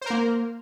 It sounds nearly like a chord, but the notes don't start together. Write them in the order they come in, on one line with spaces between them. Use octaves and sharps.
C5 A#4 A#3